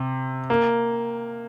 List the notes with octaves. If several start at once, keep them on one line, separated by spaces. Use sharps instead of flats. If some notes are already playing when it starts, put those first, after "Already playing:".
Already playing: C3
A#3